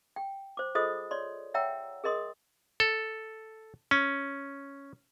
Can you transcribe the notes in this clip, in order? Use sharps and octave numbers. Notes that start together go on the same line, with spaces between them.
G5
C5 D6
F4 G#4 A4 C5 D#5 D#6
C#5 D5 C6
C#5 E5 F#5 G5 A#5 E6
G#4 A#4 D#5 C6 D#6
A4
C#4